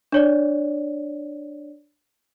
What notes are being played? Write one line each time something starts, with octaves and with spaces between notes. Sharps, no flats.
D4 C#5 D5